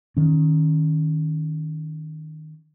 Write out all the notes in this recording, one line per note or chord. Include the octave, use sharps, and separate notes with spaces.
D#3 C#4